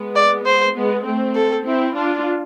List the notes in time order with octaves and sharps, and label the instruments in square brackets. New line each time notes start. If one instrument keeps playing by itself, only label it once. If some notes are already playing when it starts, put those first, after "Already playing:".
Already playing: [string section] G#3 B3
[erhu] D5
C5
[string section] G#3 B3
A3 C4
[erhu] A4
[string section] C4 E4
D4 F4